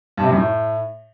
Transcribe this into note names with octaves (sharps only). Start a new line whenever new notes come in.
G2
C3
F#2
A2